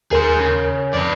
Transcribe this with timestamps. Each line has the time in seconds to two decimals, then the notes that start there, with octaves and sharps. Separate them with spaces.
0.11 D#2 G#4 A#4 C5
0.40 C#3
0.94 F2 B4 D5